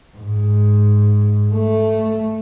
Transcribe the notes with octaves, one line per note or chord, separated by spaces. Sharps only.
G#2
A3